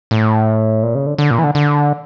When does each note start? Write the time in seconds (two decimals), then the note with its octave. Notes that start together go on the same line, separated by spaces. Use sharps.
0.11 A2
0.83 A#2
0.95 C#3
1.06 D3
1.18 D3
1.31 A#2
1.38 E3
1.44 D3
1.55 D3